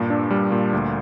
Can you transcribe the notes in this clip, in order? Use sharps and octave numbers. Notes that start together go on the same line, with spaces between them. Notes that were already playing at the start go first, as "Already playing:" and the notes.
Already playing: G2 A#2
D4
G3
A#2
D2